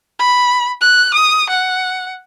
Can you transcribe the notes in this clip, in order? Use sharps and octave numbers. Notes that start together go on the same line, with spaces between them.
B5
F#6
D#6
F#5